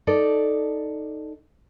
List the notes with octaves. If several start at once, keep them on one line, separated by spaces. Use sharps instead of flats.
D#4 A4 D5